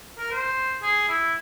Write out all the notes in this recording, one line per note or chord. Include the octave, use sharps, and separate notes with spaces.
A#4
C5
G#4
E4